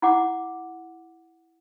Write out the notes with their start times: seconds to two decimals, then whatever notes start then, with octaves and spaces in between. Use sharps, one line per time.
0.02 E4 F#5 D6